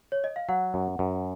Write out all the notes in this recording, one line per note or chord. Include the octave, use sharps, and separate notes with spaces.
C#5
D#5
F5
F#3 F#5
F#2
F#2